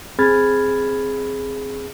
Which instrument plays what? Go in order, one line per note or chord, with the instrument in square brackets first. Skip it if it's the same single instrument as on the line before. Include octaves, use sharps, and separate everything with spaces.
[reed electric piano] C4 G#4 B5 F6 G#6 A6